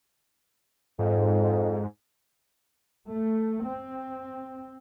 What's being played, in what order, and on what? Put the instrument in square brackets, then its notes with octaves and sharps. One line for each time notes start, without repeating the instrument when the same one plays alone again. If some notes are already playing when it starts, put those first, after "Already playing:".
[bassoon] F2 [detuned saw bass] G#2
[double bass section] A3
C4